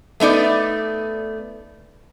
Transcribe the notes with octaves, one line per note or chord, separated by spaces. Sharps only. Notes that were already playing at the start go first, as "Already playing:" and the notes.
A3 B3 D#4 D5